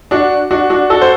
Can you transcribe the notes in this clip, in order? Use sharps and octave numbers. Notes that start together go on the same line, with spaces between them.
D4 F#4
D4 F#4
D4 F#4
F#4 A4
C5